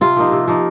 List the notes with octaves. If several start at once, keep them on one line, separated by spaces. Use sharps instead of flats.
C3 F4
F3 A#3 D#4
C3
F3 A#3 D#4